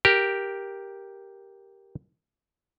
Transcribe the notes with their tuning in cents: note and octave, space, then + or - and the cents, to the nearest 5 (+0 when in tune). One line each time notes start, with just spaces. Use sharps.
G4 +0 A#4 +5